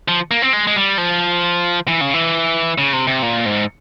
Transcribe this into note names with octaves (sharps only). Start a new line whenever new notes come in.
F3
A#3
C4
G#3
G#3
G3
F3
E3
C#3
E3
C#3
C3
C3
A#2
G#2